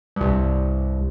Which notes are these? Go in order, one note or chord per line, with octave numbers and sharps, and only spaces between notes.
C2 G2